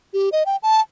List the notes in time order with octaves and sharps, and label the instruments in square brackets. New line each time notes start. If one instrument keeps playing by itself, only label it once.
[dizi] G4
D#5
G5
A5